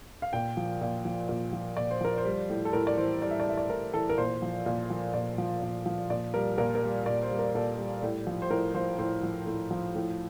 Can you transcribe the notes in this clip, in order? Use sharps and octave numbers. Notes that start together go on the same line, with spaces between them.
F5
A#2 G5
F3
A#2
F3
A#2
F3
A#2 D5
C5
F3 A#4
C5
G3
A2
A4
A2 A#4
D5
E3 C5
G3 D5
E5
D5
A2 E5
D5
A2 A#4
E3 A4
A#4
A#2 C5
F3
A#2
F3
A#2 D5
F3
A#2
F3
A#2 D5
G3 A#4
A#2 A#4
A#4
G3
A#2 D5
C5
G3
A#4
A#2 A4
G3
A2
F3
C5
A2 A#4
F3 C5
A2 C5
F3
A2
F3
A2